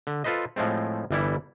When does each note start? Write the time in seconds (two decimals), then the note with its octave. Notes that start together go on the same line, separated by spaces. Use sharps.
0.07 D3
0.24 F4 A4 B4 C5 D#5
0.56 A2 F3 G#3 A3 C4
1.11 G1 E3 G3 E4